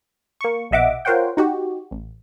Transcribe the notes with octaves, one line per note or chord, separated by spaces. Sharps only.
A#3 C#6
A#1 B2 D#5 E5 F#5 D6
F4 A#4 C5 C#5 F#5 G5
D#4 F#4 G4
A1